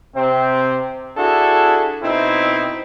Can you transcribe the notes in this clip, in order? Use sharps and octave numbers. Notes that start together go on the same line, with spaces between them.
C3 C4
D4 E4 F#4 G#4 A4
B2 C4 D#4 E4